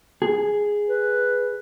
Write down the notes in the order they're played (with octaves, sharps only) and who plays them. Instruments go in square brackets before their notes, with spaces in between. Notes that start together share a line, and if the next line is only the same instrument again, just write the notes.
[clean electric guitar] G#4
[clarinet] B4